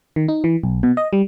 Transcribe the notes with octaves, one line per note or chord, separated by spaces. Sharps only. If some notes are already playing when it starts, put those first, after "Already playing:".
D#3
D#4
E3
B1
B2
D#5
G3